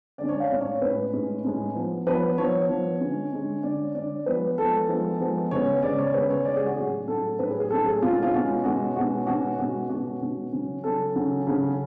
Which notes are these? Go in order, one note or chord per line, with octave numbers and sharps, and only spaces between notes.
D3 G#3 C#4 D5
C#5
F5
A2 G#3 C#4 D5
C#5
A2 G#3 C#4 B4
A2 G#3 C#4
A2 G#3 C#4
F3 B3
F3 B3 B4
F3 B3 C#5
F3 B3
D3 G#3 C#4
D3 G#3 C#4
D3 G#3 C#4 D5
D3 G#3 C#4 D5
F3 G#3 B3 B4
F3 G#3 B3 A4
F3 G#3 B3
F3 G#3 B3
C#3 G#3 B3 C#5
C#3 G#3 B3 D5
C#5
C#3 G#3 B3 B4
C#5
C#3 G#3 B3 D5
G#4
F#4
A2 F#3 C#4 G#4
A2 F#3 C#4 A4
A2 F#3 C#4 B4
G#4
G#4
A2 F#3 C#4 A4
G#4
B2 G#3 C#4 F4
F4
B2 G#3 C#4 F#4
B2 G#3 C#4 F#4
B2 G#3 C#4 F#4
B2 G#3 C#4 F#4
B2 G#3 C#4 F#4
B2 G#3 C#4 F#4
B2 G#3 C#4
C#3 F#3 C#4
C#3 F#3 C#4 A4
C#3 F#3 C#4
C#3 F#3 C#4